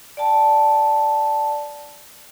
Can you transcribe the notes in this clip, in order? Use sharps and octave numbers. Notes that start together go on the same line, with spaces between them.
D5 G5 A5